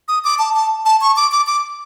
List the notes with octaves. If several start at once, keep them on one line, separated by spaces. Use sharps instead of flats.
D#6
D6
A5
A5
A5
C#6
D6
D6
D6